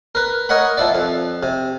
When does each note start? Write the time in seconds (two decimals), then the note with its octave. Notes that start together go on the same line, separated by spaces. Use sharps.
0.15 A#4 B4
0.49 A#4 C#5 D#5 F#5 B5
0.77 F3 E4 D5
0.95 F2
1.43 C3